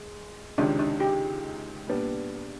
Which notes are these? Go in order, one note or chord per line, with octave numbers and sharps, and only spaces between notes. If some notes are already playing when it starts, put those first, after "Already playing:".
Already playing: G#3
C#2 C3 D#3 G#3 C#4 D4
D4
G4
A#2 G3 B3 D4